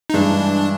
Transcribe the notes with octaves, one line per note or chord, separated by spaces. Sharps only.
D#4
G2 E3 G#3 D4